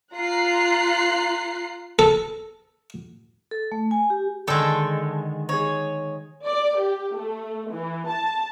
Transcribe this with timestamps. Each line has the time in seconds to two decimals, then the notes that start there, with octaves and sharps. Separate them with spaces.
0.14 F4 A#5 F#6 C7
1.99 A4
3.51 A4
3.72 A3
3.91 G#5
4.10 G4
4.47 D3 D#3 G#3 A4 G5 A5 E6
5.49 D#4 G#4 C#5
6.46 D5
6.80 G4
7.16 A3
7.70 E3
8.08 A5